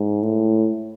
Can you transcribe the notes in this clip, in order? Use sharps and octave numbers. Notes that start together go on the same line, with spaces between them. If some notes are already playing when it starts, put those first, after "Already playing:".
Already playing: G#2
A2